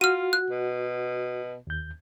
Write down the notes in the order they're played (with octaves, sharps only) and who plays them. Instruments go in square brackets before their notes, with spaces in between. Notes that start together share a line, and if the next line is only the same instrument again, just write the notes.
[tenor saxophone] F4 [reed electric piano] F#4 [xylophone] F6 D#7
[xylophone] F#6
[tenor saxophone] B2
[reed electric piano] D#2 G6